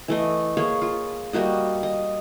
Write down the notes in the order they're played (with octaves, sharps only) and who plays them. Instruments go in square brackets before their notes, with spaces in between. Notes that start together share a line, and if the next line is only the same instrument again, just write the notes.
[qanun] E3 A3 D#5
A#3 G#4 C#5
F4
G3 A#3 F#4 D#5
D#5